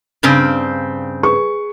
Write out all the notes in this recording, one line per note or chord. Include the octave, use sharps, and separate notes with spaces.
G2 C#3 C4
G#4 B4 C#6